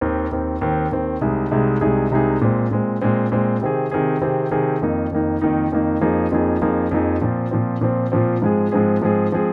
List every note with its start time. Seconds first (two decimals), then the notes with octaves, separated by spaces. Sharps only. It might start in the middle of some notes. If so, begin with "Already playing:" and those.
0.01 D#2 D#3 C4
0.31 D#2 D#3 C4
0.61 D#2 D#3 C4
0.91 D#2 D#3 C4
1.21 C2 C3 G#3 D#4 G#4
1.51 C2 C3 G#3 D#4 G#4
1.81 C2 C3 G#3 D#4 G#4
2.11 C2 C3 G#3 D#4 G#4
2.41 A#2 G#3 C4
2.71 A#2 G#3 C4
3.02 A#2 G#3 C4
3.32 A#2 G#3 C4
3.61 C3 D#3 C4 G#4
3.91 C3 D#3 C4 G#4
4.22 C3 D#3 C4 G#4
4.51 C3 D#3 C4 G#4
4.82 F2 D#3 A#3 D#4
5.11 F2 D#3 A#3 D#4
5.42 F2 D#3 A#3 D#4
5.72 F2 D#3 A#3 D#4
6.01 F2 F3 A#3 D#4 G#4
6.31 F2 F3 A#3 D#4 G#4
6.62 F2 F3 A#3 D#4 G#4
6.91 F2 F3 A#3 D#4 G#4
7.21 A#2 F3 C4
7.51 A#2 F3 C4
7.81 A#2 F3 C4
8.12 A#2 F3 C4
8.42 G#2 F3 G#3 C4 G#4
8.72 G#2 F3 G#3 C4 G#4
9.02 G#2 F3 G#3 C4 G#4
9.32 F3 G#3 C4 G#4